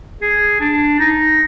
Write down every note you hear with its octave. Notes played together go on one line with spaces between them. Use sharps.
G#4
D4
D#4